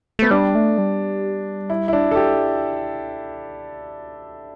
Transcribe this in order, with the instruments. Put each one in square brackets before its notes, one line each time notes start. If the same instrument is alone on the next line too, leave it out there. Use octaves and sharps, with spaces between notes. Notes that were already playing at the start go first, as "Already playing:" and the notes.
[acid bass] A3 [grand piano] B3
[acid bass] G3 [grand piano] D4
[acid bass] A3
G3
[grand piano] E4
E4
D4
A4
G4